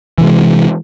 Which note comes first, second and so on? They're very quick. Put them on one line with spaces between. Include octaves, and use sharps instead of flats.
E3 C3 G#3